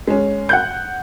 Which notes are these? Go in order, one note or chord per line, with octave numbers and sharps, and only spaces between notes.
G#3 C#4
F#5 F#6 G6